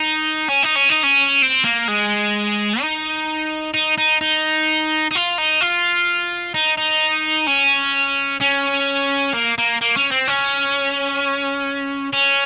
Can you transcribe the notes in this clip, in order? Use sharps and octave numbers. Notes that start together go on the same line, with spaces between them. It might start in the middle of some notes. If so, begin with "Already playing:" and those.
Already playing: D#4
C#4
D#4
C#4
D#4
C#4
C4
A#3
G#3
D#4
D#4
D#4
D#4
D#4
F4
D#4
F4
D#4
D#4
C#4
C#4
A#3
A#3
A#3
C#4
C4
C#4
C#4